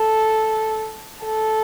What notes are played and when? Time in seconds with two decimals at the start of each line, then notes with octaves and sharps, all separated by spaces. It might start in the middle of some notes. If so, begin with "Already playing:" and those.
Already playing: A4
1.26 A4